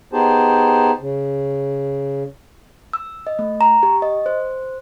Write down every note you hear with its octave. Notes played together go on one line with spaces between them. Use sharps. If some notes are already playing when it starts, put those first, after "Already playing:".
B3 D#4 G4 G#4 C5 A5
C#3
E6
D#5
A3
A#5
G4
D#5
C5